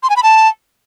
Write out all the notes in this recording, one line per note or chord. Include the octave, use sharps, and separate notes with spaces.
C6
G#5
B5
A5